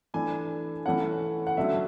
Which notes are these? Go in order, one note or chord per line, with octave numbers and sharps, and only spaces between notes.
E3 A3 D4 G#5
E3 A3 C#4 F#5
F#5
D3 F#3 A3 C#4 E5